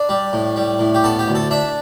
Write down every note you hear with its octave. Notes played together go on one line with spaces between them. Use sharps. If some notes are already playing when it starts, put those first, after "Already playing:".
Already playing: D4
G3
A2
G3
A2
G4
B3 A4
G4
D2
A4
D4 E5